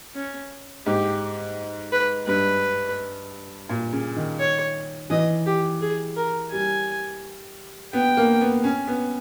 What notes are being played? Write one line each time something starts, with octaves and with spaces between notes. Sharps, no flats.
C#4
G#2 G4
B4
G2 B4
A#2
C#3
D#3
C#5
E3 D#5
G4
G#4
A#4
G3 G#5
B3 G5
A#3
B3
C#4
B3